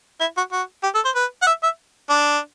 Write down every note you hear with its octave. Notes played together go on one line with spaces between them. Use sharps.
E4
F#4
F#4
G4
A4
C5
B4
F#5
E5
E5
D4